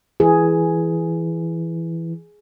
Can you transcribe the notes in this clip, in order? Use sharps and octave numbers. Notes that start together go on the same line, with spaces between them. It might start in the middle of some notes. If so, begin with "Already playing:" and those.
E3 G#4